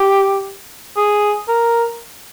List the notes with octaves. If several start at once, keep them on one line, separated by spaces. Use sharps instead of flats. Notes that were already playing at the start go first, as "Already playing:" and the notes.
Already playing: G4
G#4
A#4